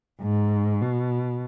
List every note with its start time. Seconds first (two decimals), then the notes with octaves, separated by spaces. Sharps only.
0.22 G#2
0.81 B2